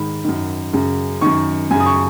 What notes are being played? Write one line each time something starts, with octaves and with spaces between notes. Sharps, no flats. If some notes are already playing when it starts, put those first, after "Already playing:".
Already playing: G#2 D#3 B5
F#2 D#3
F#2 C#3
F#2 D#3 C#6
F#2 C#3 G#5
D#6
C#6